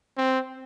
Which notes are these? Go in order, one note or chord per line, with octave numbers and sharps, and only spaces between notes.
C4